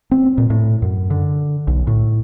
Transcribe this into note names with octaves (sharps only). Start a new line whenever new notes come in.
C4
A#2
A2
F#2
D3
B1
A2